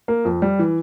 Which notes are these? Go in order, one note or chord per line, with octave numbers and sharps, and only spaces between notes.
A#3
F2
G3
E3